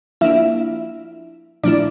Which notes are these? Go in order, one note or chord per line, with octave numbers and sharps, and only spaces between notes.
F3 A#3 D4 E4 F4 E5
A#2 F3 A3 D4 E4 D5